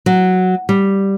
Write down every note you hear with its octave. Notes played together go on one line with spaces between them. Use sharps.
F#3
G3